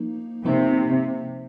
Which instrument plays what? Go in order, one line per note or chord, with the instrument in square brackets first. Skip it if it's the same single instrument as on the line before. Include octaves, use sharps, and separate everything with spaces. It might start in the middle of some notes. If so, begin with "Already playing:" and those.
Already playing: [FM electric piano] F3 A#3 D#4
[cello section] C3 [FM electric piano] F3 A#3 D#4